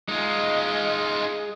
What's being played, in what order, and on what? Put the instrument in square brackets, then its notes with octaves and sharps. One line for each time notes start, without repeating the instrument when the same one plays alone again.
[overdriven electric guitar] G#3 [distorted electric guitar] D#4 F4